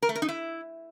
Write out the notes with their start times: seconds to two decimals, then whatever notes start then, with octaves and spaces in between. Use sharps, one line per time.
0.02 A#4
0.09 A3
0.15 A#4
0.22 D#4
0.29 E4